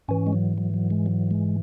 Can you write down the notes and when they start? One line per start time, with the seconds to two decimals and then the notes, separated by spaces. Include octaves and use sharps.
0.08 G#2 E3 C#4
0.27 G#3
0.33 F#3
0.58 F#3
0.74 F#3
0.90 G#3
1.06 F#3
1.31 G#3